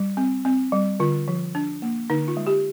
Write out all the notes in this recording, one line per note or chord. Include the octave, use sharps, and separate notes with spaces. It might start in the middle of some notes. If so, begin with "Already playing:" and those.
Already playing: G3
C4
C4
G3
D3 F4
F3
D4
A#3
D3 D#4
F4
G#3
G4